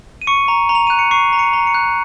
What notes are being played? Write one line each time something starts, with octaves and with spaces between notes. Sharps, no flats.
D#7
C#6 C#7
A#5
A#5
F7
F#6 D#7
C#7
C#6 C7
A#5
C#7
A#5
C#7
F#6